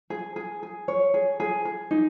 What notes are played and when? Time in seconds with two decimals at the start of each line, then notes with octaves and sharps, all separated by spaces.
0.10 G#4
0.36 G#4
0.63 G#4
0.88 C#5
1.14 G#4
1.40 G#4
1.65 G#4
1.91 D#4